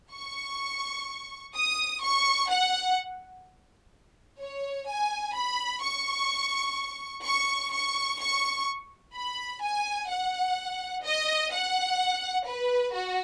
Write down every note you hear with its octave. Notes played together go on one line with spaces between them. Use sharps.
C#6
D#6
C#6
F#5
C#5
G#5
B5
C#6
C#6
C#6
C#6
B5
G#5
F#5
D#5
F#5
B4
F#4